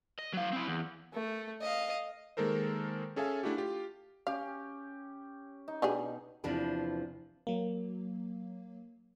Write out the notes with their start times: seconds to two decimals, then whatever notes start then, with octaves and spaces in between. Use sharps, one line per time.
0.19 D#5
0.33 F#3 F5
0.53 C4 E4
0.68 E2
1.14 A3
1.62 D#5 F5
2.37 D#3 G#3 A#3 A4 A#4 C5
3.16 C#4 G#4 A4 E5 F5 G#5
3.43 A3 D4 E4 F#4 G4
3.57 F4 G4
4.27 C#4 G4 F5
5.68 D#4
5.82 B2 D4 G4 G#4
6.44 E2 C3 F3 D4 B4
7.47 F#3 A#3